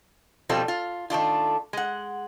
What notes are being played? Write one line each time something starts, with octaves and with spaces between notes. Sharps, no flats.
B2 F3 G3 C4 F4 A4
F4
D#3 A3 D4 F4
G#3 F#5